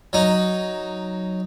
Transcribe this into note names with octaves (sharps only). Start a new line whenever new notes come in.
F#3 D#4